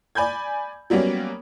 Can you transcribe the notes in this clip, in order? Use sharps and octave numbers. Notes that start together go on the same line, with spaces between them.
D5 G#5 B5 G6 G#6
F#3 G3 A#3 B3 C#4